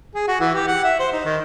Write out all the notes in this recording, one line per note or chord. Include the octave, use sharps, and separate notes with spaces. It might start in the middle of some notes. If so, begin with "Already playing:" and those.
G#4
F#4
E3
G4
F#5
E5
C5
D#4
D#3